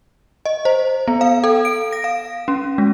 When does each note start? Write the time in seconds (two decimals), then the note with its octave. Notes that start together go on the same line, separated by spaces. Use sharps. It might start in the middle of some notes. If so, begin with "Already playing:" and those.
0.46 D#5
0.65 C5
1.08 B3
1.21 F5
1.44 A4
1.65 D7
1.93 A#6
2.04 F5
2.48 C#4
2.78 G#3